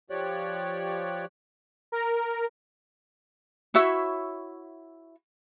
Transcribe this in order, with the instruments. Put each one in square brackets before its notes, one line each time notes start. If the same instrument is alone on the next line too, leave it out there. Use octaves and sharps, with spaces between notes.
[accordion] F3 G4 C#5 D5 F#6
[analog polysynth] A#4
[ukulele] E4 F#4 C#5 E5